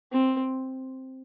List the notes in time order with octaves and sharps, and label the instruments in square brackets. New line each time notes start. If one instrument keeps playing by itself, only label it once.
[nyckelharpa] C4